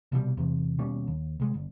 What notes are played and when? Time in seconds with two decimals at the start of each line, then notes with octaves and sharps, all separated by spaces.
0.12 C2 B2 E3 G3
0.37 E2 C3
0.79 D#2 B2 G3 C#4
1.07 D#2
1.40 C2 G#3
1.54 G1